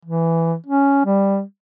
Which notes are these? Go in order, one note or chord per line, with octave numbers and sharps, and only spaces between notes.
E3
C#4
G3